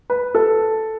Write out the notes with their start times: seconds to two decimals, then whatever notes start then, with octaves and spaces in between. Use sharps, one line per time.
0.10 B4
0.35 A4